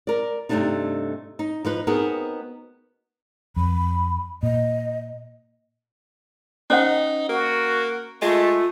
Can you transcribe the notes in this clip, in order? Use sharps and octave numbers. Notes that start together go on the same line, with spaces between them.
A#4 D5
G2 C3 D#3 A3 D4 D#4
D#4
F3 D#4 B4
B3 C4 D#4 F#4 G#4 A#4
F2 B5
A#2 D#5
C#4 D#4 C5 F#5
A#3 F#4
G#3 A3 F4